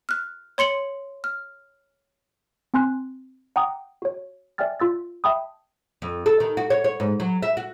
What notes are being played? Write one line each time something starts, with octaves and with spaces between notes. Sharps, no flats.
F6 F#6
C#5 C6 C#7 F#7
F6
C4 G#5 C6 F#6
F#5 G5 A#5 D6 D#6
F#4 C#5
D5 E5 G5 G#5 F6 A6
F4 E6 A6
E5 G5 A5 B5 D#6
F2
A4
D#3
F#4
C#5
C#5
G#2
F#3
E5
F#4